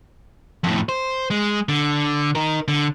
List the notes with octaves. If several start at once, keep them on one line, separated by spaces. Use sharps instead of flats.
F2 A2
C5
G#3
D3
D#4 A#4
D3